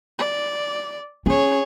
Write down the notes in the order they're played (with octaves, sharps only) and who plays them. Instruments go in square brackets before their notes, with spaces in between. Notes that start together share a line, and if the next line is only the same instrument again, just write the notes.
[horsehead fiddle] D5
[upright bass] C#4 [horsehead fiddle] G#4 C#5